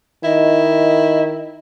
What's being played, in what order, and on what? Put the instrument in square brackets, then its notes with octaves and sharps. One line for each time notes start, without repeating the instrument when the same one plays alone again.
[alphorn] D#3 [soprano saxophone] E4 [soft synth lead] D#5